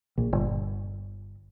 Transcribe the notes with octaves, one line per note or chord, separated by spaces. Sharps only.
A#1
G1